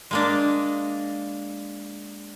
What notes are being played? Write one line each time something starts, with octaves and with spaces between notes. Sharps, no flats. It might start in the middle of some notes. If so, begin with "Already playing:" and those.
G#3 A#3 D4